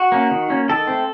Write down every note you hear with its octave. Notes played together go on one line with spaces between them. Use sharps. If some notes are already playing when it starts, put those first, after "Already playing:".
Already playing: F#4
A#3 C#4
D#3
A#3 C#4
D#3 A4
A3 C4